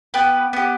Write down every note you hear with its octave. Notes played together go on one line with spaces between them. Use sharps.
B3 G4 B4
B3 G4